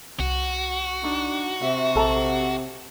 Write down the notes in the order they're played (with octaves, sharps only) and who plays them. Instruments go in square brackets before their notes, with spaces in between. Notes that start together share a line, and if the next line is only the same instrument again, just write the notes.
[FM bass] C2 [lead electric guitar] F#4
[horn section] D4 [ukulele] D#4
[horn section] C3 [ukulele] E5
[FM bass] A#1 [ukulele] A4 A5 A#5